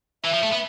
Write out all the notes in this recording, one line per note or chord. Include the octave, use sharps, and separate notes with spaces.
E3 E5
F3
A3
B3